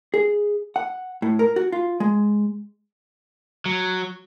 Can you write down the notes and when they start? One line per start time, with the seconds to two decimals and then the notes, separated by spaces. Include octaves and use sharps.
0.14 G#4
0.76 F#5
1.22 A2
1.39 A#4
1.56 F#4
1.72 F4
2.00 G#3
3.66 F#3